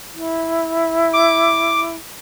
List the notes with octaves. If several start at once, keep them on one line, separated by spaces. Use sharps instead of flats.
E4
D6